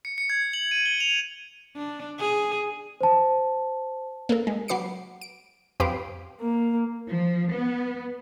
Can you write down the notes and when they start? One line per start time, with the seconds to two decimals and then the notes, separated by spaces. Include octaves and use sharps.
0.05 C#7
0.18 C#7
0.30 G#6
0.53 F#7
0.71 D#7
0.86 G7
1.00 F7
1.76 D4
2.19 G#4
3.01 C5 A5
4.29 A#3 A4 A#4
4.47 G#3
4.68 F#3 F#4 B4 D6 C7 C#7
5.21 D7
5.80 F2 C4 G4 B4 F5 D6
6.41 A#3
7.09 F3
7.51 B3